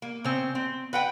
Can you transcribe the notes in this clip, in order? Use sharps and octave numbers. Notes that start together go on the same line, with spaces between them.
A#3
C#3 C4
C4
B4 F#5 G5